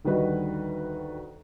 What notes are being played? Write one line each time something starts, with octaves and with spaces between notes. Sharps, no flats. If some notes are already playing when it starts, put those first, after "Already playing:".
D2 D#3 G3 F#4 B4 D#5